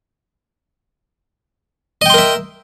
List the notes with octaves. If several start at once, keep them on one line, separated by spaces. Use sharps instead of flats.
A#4 D#5 E5 G5 C6